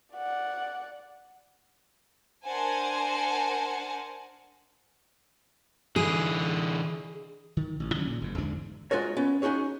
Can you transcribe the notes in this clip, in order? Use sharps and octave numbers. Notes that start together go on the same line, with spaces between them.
D5 F#5
D4 A#4 C5 F#5 G#5 A5
D3 E3 G#4
D#3
A1
D3 F#3 G3 C#4
A#2 C#3
F#1 G#2
E2 G#2 D3 D4
G#3 F4 F#4 A#4 C#5
B3 C#4
C#4 D#4 F#4 G#4 C#5